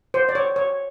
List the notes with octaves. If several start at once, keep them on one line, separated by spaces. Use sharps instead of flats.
C5
D5
C#5
C#5